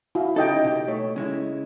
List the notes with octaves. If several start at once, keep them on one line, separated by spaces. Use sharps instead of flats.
E4 F#4 F5
C#3 D#4 G4 A4 D#5 G5
B2 G4
A3 C#5
C#3 G#3 E4